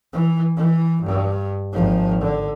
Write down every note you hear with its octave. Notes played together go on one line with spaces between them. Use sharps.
E3
E3
G2
G#1 F3
D3